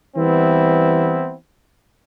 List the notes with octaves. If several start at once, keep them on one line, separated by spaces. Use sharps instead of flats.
E3 G3 B3 C4 E4